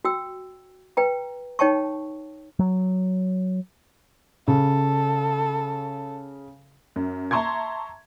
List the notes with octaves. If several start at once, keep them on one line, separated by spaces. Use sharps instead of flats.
F#4 G5 E6
B4 G5 A#5
D#4 C#5 G5 A5 C#6
F#3
C#3 A4
F#2
E5 A5 A#5 C6 C#6 G#6